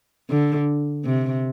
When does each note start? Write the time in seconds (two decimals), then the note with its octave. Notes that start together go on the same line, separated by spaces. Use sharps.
0.30 D3
1.05 C3